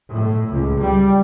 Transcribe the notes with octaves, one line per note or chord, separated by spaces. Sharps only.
A2
C#2
G3